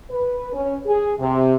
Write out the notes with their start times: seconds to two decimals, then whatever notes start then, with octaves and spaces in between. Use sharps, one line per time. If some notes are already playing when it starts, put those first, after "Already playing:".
0.10 B4
0.54 C#4
0.85 G#4
1.18 C3